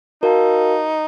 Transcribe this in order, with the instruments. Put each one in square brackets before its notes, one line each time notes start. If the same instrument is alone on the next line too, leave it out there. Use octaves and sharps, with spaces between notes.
[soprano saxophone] D#4 [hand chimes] F#4 A#4 F5 A5